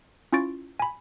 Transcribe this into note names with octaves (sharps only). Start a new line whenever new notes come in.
C#4 E4 F4 C#6 A6 D7
G#5 B5